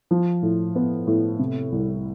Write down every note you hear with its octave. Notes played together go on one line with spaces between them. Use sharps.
F3
A2
B3
A2
C3
C2